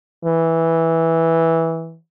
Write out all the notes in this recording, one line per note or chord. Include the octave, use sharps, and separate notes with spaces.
E3